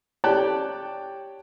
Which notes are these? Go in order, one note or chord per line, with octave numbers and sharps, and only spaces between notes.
G4 C#5 D5 G5 A5 F#6